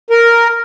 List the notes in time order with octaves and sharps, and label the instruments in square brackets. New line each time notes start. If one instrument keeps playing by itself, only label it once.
[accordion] A#4